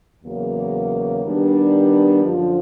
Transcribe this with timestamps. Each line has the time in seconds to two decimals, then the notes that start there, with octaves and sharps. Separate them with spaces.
0.23 E2 C#3 F#3 A#3
1.23 D#3 G3 B3 D4
2.24 F#2 D3 F3